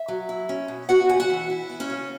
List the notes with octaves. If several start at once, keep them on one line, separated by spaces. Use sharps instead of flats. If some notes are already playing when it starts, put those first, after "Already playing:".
Already playing: E5
F#3
E4
C#4
B2
B3 F#4 F#5
C#3 G#5
F#4 F#5
E3
E4
B3
C#4 C#5
C#3